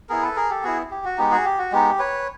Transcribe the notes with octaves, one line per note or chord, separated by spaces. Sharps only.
B3 E4 G#4 A#4
A4 B4
G#4 A#4
G4 A4
B3 E4 F#4 G#4
G4
F#4
G#3 B3 D#4 G4
F#4 G#4
G4
F#4
G#3 B3 D#4 G4
B4 C#5